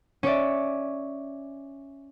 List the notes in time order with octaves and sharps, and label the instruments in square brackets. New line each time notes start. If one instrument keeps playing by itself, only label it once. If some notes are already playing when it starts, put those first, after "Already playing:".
[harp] C#4 C#5 D5 E5